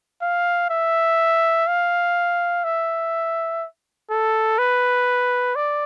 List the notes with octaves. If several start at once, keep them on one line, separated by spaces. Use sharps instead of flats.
F5
E5
F5
E5
A4
B4
D5